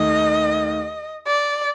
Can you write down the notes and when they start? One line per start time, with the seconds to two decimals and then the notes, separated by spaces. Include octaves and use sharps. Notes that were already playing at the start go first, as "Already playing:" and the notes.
Already playing: D#2 D#3 A3 D#5
1.27 D5